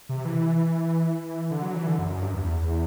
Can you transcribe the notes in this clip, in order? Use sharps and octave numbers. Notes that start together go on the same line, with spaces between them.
C3
E3
E3
E3
D3
F#3
E3
D3
F#2
F#2
G2
E2